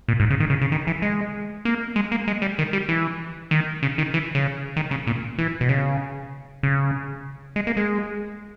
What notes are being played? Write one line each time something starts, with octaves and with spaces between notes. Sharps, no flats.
A#2
G#2
C#3
D#3
C#3
C#3
D#3
E3
G#3
A#3
G#3
A#3
G#3
G3
D#3
G3
E3
D#3
C#3
D#3
E3
C#3
D#3
C#3
A#2
E3
B2
C#3
C#3
G#3
A#3
G#3